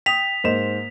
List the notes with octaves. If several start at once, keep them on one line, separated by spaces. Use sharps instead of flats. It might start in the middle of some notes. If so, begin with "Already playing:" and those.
G5 D#6 B6 F7
G#2 A#3 C5 D#5 E7